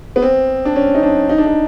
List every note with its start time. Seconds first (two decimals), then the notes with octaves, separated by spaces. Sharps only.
0.16 B3
0.22 C4
0.65 D4
0.76 C#4
0.95 D#4
1.03 D4
1.29 D#4
1.38 D4
1.46 D#4